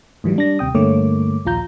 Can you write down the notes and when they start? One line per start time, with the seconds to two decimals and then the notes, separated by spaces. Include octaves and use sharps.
0.24 G#2 E3 F#3 G3
0.36 G3 D4 A#6
0.59 D#2 C3 G5 D#6
0.75 G2 D3 A3 A#3 C#5 D6
1.45 A#1 D#2 F4 A#5 G6